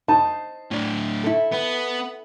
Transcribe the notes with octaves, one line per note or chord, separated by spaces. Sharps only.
D#4 C5 A5
A2 D4
E4 A4
B3